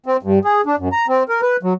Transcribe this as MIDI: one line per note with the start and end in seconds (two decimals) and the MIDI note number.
0.06 0.17 60
0.23 0.39 43
0.45 0.61 68
0.66 0.76 62
0.78 0.88 42
0.92 1.06 82
1.08 1.23 60
1.29 1.41 70
1.42 1.57 71
1.63 1.73 54